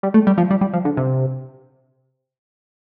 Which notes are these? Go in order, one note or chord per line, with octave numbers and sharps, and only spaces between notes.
G3
A3
G3
F3
G3
G3
F3
D3
C3